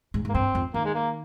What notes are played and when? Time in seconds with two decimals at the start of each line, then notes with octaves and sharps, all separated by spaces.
0.14 G#2
0.25 G#2 A#3
0.34 G2 C4
0.55 F2
0.74 D#3 A#3
0.85 G#3
0.95 A#3